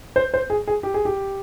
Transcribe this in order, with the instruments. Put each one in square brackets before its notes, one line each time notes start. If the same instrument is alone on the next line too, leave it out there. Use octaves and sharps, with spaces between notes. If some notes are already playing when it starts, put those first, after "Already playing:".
[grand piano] C5
C5
G#4
G#4
G4
G#4
G4